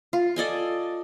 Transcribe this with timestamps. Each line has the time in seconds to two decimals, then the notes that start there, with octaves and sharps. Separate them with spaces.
0.13 F4
0.36 A4 D5 D#5 G#5